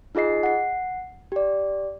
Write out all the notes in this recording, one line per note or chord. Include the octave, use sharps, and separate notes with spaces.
D#4 F4 G#4 D#5 C7
F#5 C7
G4 D5